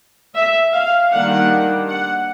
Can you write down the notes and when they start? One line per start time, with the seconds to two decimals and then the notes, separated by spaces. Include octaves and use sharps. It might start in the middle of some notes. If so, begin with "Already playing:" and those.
0.35 E5
0.73 F5
1.12 D#3 G3 A#3 D4 F#5
1.89 F#5